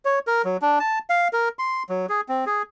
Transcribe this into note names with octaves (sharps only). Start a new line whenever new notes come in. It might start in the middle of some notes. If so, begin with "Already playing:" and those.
C#5
A#4
F#3
D4
A5
F5
A#4
C6
F#3
G#4
C4
G#4